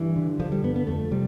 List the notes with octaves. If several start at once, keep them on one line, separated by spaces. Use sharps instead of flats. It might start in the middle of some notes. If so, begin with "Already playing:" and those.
Already playing: G2 E3
D3
D3 F3
G3
G2 B3
B3
F2 A3
C3 G3